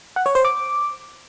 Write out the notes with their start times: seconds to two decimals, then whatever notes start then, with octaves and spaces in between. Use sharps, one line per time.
0.16 F#5
0.26 C#5
0.35 C5
0.45 D6